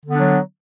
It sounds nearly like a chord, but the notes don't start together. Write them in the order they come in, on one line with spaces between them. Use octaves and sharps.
D3 B3 D4 F#3